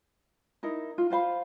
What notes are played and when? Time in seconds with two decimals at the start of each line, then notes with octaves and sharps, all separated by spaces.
0.63 D#4 E4 A#4
0.98 F4
1.10 F4 C5 F5 B5